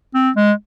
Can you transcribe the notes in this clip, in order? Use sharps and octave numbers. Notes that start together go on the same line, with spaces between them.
C4
G#3